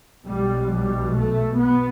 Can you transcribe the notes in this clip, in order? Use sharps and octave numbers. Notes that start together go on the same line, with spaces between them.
B1 B2 G3
G3
A3
B3